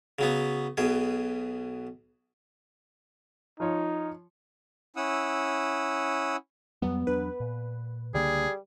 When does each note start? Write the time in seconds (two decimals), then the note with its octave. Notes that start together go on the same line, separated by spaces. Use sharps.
0.19 C#3 F#3 B3
0.77 B1 B2 G#4
3.60 F3 D#4 F4 C#5
4.96 C#4 E4 F#5 D#6 E6
6.82 F2 F#3 G3 B3
7.07 E2 F#3 D4 B4
7.40 A#2
8.14 C#2 D3 G3 A#3 G#4